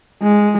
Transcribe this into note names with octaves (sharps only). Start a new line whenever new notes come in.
G#3